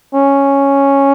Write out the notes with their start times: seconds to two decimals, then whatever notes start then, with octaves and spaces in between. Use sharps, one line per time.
0.14 C#4